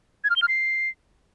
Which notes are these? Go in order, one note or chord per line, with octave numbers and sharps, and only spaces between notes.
G#6
F6
G7
F6
C7